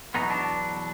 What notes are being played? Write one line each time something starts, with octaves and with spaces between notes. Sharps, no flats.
E2 B2 F#3 B3 D#4
D4